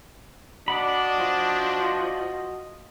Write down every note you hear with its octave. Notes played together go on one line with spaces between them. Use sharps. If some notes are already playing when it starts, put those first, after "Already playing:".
D4 F#4 D5 D#5 F#5 B5
F3